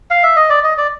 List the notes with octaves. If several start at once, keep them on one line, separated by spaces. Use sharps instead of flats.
F5
E5
D#5
D5
D#5
D5